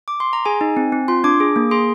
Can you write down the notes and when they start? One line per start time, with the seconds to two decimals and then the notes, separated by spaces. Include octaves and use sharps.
0.08 D6
0.20 C6
0.33 A#5
0.45 G#4 G#5
0.61 D#4
0.77 C4
0.92 C4
1.08 F4 C6
1.24 D4 D6
1.40 G#4
1.56 A#3
1.71 G#4 C6